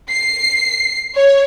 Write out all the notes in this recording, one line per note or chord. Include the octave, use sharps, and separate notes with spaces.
C7
C#5